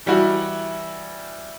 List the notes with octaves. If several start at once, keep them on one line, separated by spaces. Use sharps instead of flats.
E3 G3 E4 F#4